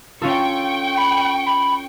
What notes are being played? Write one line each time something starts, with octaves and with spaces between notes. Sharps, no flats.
C#4 F4 A4 G5 C#6
B5
B5